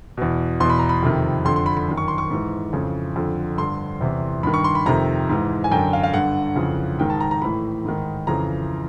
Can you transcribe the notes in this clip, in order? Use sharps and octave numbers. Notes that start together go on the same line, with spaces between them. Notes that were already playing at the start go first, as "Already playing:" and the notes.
E2 B2
E2 B2 C6
B5
A#5
B5
F2 C3 D#3
F2 D3 C6
C6
B5
B5
F#2 D#3
C#6
C6
C#6
G#2 E3
F2 C#3 E3
F2 D3
G2 D3 C6
E2 C3 E3
G2 D#3 B5
C#6
C6
B5
F2 C3 D#3 A#5
G#2 E3
G#5
F#2 D3 G5
F5
F5
G2 D3 F#5
F2 C#3 E3
G#2 D#3 G5
A5
A#5
A#5
A2 E3 B5
G#2 D#3
F2 C#3 E3 A#5